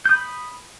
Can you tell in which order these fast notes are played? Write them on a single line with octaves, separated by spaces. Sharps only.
G6 D#6 B5